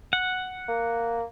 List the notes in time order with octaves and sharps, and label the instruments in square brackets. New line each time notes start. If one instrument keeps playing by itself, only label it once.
[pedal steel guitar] F#5
[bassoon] A#3